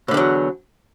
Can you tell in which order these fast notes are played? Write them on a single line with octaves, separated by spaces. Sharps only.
A2 D3 E2 F#3